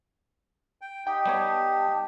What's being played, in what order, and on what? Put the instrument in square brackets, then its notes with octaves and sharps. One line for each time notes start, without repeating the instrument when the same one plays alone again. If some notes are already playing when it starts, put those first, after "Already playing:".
[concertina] G5
[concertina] D#4 G4 [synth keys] G5
[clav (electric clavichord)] G3 B3 C#5 [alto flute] A5